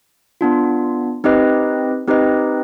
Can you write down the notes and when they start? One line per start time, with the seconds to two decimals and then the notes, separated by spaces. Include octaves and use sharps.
0.41 B3 D4 F4
1.24 C4 D#4 G4 B4 D#5
2.08 C4 D#4 G4 B4 D#5